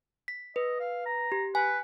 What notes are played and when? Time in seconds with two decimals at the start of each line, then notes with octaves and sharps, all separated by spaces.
0.28 B6
0.56 B4 D#5
0.80 F5
1.06 A#5
1.32 G4
1.55 B4 G#5